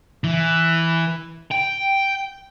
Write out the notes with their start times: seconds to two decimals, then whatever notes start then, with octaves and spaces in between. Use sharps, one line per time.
0.24 E3
1.51 G5